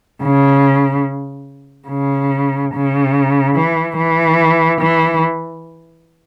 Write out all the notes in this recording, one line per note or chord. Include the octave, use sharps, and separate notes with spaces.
C#3
C#3
C#3
E3
E3
E3